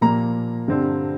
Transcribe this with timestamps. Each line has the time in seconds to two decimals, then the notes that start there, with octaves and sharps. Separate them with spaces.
0.01 A#2 F3 A#3 A#5
0.68 G2 D3 G3 C4